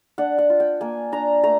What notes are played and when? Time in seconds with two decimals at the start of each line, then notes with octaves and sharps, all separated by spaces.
0.18 D4 F#5
0.38 F#5
0.50 F4
0.60 G5
0.81 A#3 G#5
1.12 D4 A#5
1.43 A3 A#5